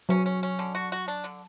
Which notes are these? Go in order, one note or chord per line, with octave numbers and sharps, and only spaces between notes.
F#3 C#4
C#4
C#4
D3
F#4
F#4
D4
D3